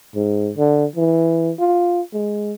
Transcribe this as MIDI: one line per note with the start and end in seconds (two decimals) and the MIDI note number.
0.15 0.51 44
0.58 0.85 50
0.96 1.52 52
1.60 2.01 65
2.14 2.53 56